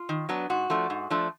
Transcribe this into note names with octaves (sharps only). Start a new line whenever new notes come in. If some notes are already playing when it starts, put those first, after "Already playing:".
Already playing: F4
D#3
F#3 B3 D4
G#2 F#4
F3 A3 D4
G#2
F3 A3 D4